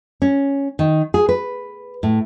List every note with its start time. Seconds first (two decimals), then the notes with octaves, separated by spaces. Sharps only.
0.22 C#4
0.79 D#3
1.14 G#4
1.29 B4
2.03 A2